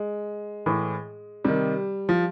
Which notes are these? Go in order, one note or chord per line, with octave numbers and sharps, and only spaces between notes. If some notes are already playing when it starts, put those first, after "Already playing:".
Already playing: G#3
A2 E3
C3 D#3 G3
F3